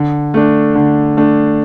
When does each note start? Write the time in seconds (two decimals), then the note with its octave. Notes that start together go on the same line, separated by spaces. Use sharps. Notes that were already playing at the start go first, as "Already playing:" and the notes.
Already playing: D3
0.34 A3 D4
0.75 D3
1.17 A3 D4